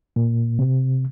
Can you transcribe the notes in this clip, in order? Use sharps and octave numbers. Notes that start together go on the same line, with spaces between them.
A#2
C3